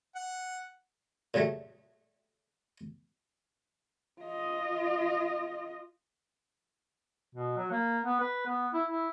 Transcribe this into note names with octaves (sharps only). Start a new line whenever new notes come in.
F#5
A#2 C#3 F#3 G3 A3
F4 D#5
B2
F#3
A#3
B3
B4
B3
E4
E4